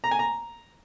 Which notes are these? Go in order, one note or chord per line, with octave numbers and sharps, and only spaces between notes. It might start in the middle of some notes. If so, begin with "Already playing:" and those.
A#5
G#5
A#5